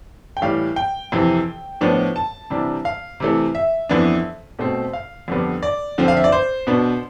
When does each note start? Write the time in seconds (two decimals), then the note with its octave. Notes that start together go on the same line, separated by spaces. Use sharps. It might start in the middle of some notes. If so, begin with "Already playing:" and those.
0.37 G5
0.42 A2 E3 G3 F5
0.76 G5
1.12 F2 C3 E3
1.81 A2 F3 B3 D4
2.16 A5
2.50 C3 E3 G3 D4
2.85 F5
3.20 C3 E3 A3
3.55 E5
3.89 F2 E3 B3 D4
4.59 B2 A3 C4
4.93 F5
5.28 F2 D3 G3 B3
5.63 D5
5.98 D3 F3 C4
6.08 F5
6.17 E5
6.24 D5
6.32 C5
6.67 B2 B3 D4